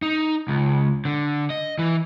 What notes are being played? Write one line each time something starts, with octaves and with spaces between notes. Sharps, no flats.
D#4
C#2
D3
D#5
E3